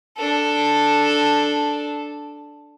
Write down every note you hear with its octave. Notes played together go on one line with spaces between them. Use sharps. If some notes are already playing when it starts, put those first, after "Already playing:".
D4 A4